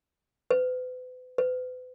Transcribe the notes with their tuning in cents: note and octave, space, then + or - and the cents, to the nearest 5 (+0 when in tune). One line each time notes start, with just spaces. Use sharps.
B4 +40
B4 +40